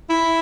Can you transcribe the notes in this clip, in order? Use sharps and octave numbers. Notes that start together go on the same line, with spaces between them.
E4